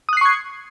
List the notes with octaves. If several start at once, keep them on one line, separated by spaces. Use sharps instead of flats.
C#6 D#6 F#6 G#6 C7